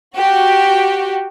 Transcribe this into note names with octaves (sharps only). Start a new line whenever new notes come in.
F#4 G4